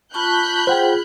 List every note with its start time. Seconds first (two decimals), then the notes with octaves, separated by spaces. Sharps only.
0.14 F4 A5 B5 C#6 F#6 G6
0.67 F4 G#4 C5 F#5 G5